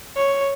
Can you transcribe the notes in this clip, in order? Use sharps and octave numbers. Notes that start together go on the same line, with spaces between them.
C#5